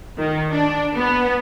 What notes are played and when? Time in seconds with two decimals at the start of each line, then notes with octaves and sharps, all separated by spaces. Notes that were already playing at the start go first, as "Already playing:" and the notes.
0.18 D#3
0.52 D4
0.95 B3